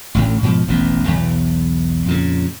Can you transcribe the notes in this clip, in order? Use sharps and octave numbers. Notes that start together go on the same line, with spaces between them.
A1 D2 A2
G#2 B2 D3 F3
E1 A1 D#2 B3
B1 E2
F2 A#2 C#3